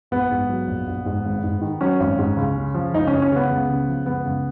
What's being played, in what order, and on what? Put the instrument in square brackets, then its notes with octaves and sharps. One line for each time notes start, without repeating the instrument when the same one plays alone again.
[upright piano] A#1 B3
G#2
F#3
A#1
A#1
G#2
G#1
G#2
D#3
F#3 C#4
G#1
G#2
C#2
C#3
F3
C#2 D#4
C#4
C#2
C#4
C#3 B3
C#2
C#3
F3
C#2 B3
C#2